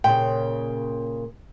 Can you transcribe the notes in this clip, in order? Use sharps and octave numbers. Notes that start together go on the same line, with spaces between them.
A#2 C#3 G5